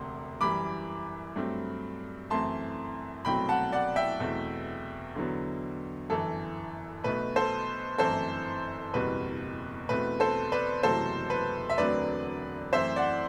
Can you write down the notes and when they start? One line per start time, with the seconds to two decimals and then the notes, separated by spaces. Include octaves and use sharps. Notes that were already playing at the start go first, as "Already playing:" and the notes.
Already playing: E1 D2 C3 C6
0.41 F#2 E3 G3 B5 D6
1.36 G2 F#3 A3 C4
2.30 F#2 E3 A3 C4 A5 C6
3.25 C2 B2 F#3 A3 C4 G5 B5
3.49 F#5 A5
3.72 D5 F#5
3.96 E5 G5
4.20 E2 B2 A3 C4
5.15 E2 D3 F#3 B3
6.10 G1 F#2 E3 A4
7.04 B1 B2 A3 B4
7.36 A4 C5
7.98 G1 F#2 E3 A3 C4 A4 C5
8.94 F#1 E2 B2 G3 C4 B4
9.89 E2 B2 A3 C4 B4
10.20 A4 C5
10.52 B4 D5
10.83 F#1 E2 C3 F#3 A3 A4 C5
11.30 B4
11.70 E5
11.78 E1 D2 D3 F#3 C4 B4 D5
12.72 F#2 E3 A3 C4 C5 E5
12.96 D5 F#5